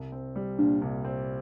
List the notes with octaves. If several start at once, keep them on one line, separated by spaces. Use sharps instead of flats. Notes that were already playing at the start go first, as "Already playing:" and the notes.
Already playing: C2
C4
G3
A#2 D4
C2
C4